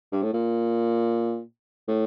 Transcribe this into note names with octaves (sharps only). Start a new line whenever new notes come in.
G2
A2
A#2
A2